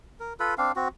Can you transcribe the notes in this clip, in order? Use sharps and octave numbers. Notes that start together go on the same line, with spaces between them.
A#4
F4 A4 B4 B5
C4 D4 F5
C4 F#4